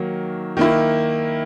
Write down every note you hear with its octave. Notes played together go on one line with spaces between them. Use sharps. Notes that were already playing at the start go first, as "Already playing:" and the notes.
Already playing: D#3 F#3 A#3
D#3 A#3 E4